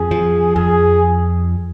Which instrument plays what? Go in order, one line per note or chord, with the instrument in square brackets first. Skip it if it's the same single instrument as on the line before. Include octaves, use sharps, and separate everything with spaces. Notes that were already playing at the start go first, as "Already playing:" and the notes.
Already playing: [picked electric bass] F2 [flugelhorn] G#4
[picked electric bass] F3
[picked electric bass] F2 [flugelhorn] G#4